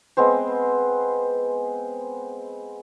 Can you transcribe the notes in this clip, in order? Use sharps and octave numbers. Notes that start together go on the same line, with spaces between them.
G#3 B3 C4 C5